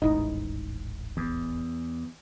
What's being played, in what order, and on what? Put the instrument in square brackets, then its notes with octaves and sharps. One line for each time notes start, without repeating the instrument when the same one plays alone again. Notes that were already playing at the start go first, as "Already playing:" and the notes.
[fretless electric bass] D#1 A1 G#2 [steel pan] D#4 E4 D#5
[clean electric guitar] E2